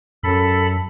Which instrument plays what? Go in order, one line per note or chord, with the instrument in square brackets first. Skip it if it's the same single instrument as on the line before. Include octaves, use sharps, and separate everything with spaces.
[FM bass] F#2 [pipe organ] A4 B5